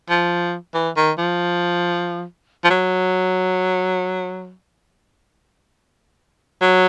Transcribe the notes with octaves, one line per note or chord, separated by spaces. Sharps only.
F3
E3
D#3
F3
F3
F#3
F#3